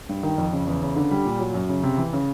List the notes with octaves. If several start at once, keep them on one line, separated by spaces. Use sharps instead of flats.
G2
D#3
F2
C#3
E2
C#3
D3
G3
A#2
F#3
F#2
C#3
C3
E3
C#3